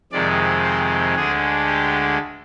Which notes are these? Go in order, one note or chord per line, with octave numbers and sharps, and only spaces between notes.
F2 C3 D#3 G#3 D5
C5
D2 D3 G#3 G#4
G4